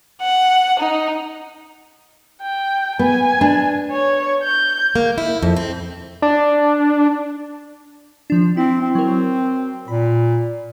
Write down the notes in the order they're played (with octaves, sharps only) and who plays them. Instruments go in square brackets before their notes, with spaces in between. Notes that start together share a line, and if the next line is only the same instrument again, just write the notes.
[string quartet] F#5
D#4
[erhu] G5
[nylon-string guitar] B3 [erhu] G#5
[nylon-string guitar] D4
[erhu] C#5
G6
[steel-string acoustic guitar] A#3
E4
F2
C4
[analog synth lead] D4
[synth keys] F3 D4
[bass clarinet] C4 [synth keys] E4
[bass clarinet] C4
[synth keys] F#3 A#4
[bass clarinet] A#2 [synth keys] B5